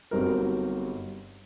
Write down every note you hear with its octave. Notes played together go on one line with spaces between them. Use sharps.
G1 G2 F#3 C4 D#4 A#4